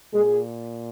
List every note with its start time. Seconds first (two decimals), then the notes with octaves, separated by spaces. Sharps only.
0.14 A#2 G#3 G#4